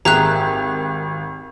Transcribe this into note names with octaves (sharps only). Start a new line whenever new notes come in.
G#1 G4 G#4 A#4 E5 A#5 F#6